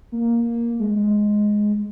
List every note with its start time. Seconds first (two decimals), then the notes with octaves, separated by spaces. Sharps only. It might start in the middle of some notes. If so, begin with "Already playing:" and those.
0.12 A#3
0.79 G#3
0.96 G#3